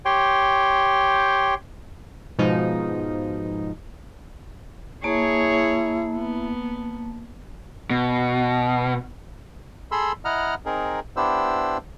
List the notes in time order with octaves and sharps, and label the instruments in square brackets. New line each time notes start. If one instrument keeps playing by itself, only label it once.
[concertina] G4 C#5 G5 C6
[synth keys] G#2 B2 F3 D#4
[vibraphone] A#3 A5 [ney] E4 [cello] G#4 C#5
[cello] B3
[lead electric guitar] B2
[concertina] G#4 A4 B5 C6 E6
E4 D#5 F#5 A#5 F6
C4 D#4 G#4 A#4
B3 D4 E4 G4 C5 E6